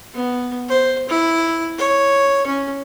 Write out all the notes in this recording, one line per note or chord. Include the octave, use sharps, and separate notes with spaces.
B3
C5
E4
C#5
C#4